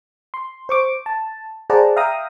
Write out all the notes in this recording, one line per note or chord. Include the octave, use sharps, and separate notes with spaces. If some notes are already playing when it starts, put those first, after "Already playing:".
C6
C5 C#6 D6
A5
G#4 C5 D5 F#5 A5 A#5
E5 F5 G5 A#5 D#6